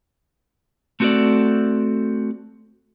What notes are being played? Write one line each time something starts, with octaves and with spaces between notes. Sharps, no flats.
A3 C4 F#4 G#4 A4 D5